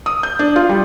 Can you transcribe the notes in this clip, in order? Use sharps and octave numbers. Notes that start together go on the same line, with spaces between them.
D#6
G6
D4
F4
G3